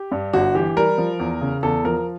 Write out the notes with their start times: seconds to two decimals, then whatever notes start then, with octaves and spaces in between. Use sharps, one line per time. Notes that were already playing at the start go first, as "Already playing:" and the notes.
Already playing: G4
0.11 G2
0.33 G1 F#4
0.55 E3 G4
0.76 G3 A#4
0.98 F3
1.20 E2
1.42 C#3
1.63 E2 A4
1.85 F3 A#4